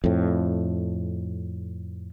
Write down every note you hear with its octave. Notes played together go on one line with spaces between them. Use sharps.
F2 A2